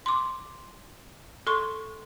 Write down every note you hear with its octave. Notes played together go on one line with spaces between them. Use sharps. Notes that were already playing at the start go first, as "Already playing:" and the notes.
C6 D6
A4 C6 C#6